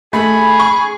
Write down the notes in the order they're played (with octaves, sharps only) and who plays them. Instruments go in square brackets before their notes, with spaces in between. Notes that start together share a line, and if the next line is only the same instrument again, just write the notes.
[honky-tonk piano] A3 [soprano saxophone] G#4 [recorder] B5
[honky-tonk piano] C#6